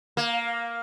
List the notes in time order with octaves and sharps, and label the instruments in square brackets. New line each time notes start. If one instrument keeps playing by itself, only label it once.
[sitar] A#3